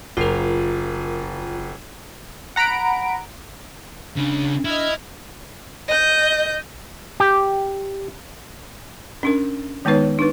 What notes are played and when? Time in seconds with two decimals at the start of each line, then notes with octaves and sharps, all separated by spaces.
0.17 F#1 F4 A#4
2.56 F#5 A#5 B5 D7
4.17 C#2 C#3 D4
4.65 E4 D#5 F6 G#6
5.88 D#5 G6
7.20 G4
9.23 C#4 D4 A#4
9.85 D#3 G#3 B3 D#4 B4 C#5
10.19 D4 D#4 B4